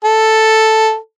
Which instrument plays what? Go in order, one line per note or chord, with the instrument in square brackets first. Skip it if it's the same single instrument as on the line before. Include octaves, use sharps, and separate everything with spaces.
[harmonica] A4